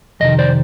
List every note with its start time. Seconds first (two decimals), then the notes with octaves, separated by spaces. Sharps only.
0.20 F2 C3 D#3 D#5
0.39 C5 D5